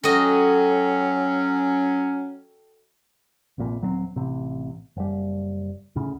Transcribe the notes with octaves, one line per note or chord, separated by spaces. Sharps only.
F#3 C#4 F#4 A4 D#5 G5
F1 A#1 F2 A#2
D#1 F#3 A3 C4
A1 C3
F#1 G3
D2 A2 C#3